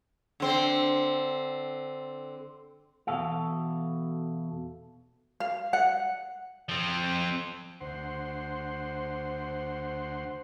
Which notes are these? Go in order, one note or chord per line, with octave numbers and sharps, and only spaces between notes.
D3 C4
E2 B2 A4 F5
F5
F#5
F3 C4
D2 C5 F#5 C6